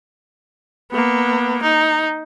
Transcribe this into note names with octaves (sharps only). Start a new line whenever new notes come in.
A#3 B3
D#4